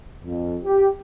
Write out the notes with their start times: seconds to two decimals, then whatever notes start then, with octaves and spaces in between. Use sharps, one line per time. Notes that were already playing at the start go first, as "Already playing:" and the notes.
0.25 F2
0.64 G4